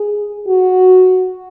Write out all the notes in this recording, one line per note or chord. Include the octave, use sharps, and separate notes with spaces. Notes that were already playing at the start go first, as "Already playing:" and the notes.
Already playing: G#4
F#4